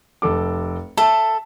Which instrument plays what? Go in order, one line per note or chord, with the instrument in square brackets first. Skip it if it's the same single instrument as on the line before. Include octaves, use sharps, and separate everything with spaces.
[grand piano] F1 A4 D6
[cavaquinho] A4 [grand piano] E5 A5